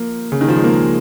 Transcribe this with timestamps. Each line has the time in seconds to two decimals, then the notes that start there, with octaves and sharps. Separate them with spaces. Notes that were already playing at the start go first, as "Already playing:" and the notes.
Already playing: F3 A#3
0.32 C#3
0.41 D#3
0.49 F3
0.57 G#3
0.64 A#3